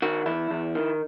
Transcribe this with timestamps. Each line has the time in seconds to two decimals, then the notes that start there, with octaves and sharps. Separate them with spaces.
0.02 D#3 F#4
0.26 E2 E4
0.51 E2
0.75 D#3